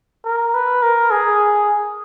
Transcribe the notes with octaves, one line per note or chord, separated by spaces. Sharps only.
A#4
B4
A#4
G#4